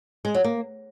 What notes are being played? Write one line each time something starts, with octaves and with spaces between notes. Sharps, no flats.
G#3
F#3
A#3